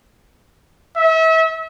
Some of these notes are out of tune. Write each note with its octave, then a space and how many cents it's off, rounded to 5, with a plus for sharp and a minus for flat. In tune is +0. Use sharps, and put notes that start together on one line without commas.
E5 -35